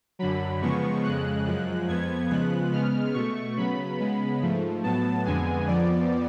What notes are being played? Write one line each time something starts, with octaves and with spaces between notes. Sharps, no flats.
F#2 D3 F#3 B5
C#3 F3 G#3 B3 C#6
F2 C#3 G#3 F#6
F#2 F3 G#3 F#6
F2 F3 B3 G#6
C#3 F3 G#3 B3 F#6
C#3 G#3 B3 F6
B2 A3 C#6
C#3 F#3 B3 B5
C#3 G#3 B3
G#2 F3 A3
A2 F#3 B3 A5
F2 D3 G#3 B3 G#5
F2 F3 B3 D5